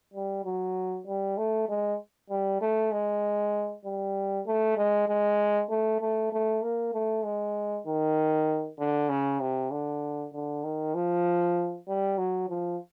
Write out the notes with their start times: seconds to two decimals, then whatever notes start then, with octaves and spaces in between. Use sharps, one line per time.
0.14 G3
0.45 F#3
1.07 G3
1.38 A3
1.69 G#3
2.30 G3
2.61 A3
2.92 G#3
3.85 G3
4.47 A3
4.77 G#3
5.08 G#3
5.70 A3
6.01 A3
6.32 A3
6.62 A#3
6.93 A3
7.24 G#3
7.86 D#3
8.79 D3
9.09 C#3
9.40 C3
9.71 D3
10.33 D3
10.64 D#3
10.95 F3
11.88 G3
12.18 F#3
12.49 F3